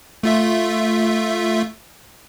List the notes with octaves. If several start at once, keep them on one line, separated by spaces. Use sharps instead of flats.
A3 F4 E5